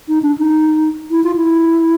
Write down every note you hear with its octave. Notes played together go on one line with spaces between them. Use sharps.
D#4
D4
D#4
E4
F4
E4